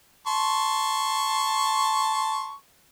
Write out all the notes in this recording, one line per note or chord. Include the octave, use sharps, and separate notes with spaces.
A5 C6 C#6